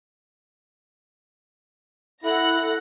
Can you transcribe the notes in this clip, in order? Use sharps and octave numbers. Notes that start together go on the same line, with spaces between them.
E4 A4 F#5 F#6 A#6